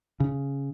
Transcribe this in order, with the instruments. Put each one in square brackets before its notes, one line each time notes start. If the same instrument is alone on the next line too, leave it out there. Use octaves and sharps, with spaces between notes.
[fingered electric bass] C#3